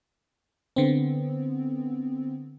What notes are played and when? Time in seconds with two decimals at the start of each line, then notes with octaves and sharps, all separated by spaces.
0.76 D3 B3 C4